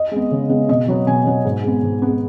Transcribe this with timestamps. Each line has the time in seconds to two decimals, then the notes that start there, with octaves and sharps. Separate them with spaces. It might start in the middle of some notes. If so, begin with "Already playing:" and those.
Already playing: D#5
0.11 G#3 B3
0.31 C#3
0.49 G#3 B3
0.69 B2 D#5
0.88 F#3 B3
1.07 B2 G#5
1.26 F#3 B3
1.45 G#2
1.63 G#3 B3
1.83 G#2
2.02 G#3 B3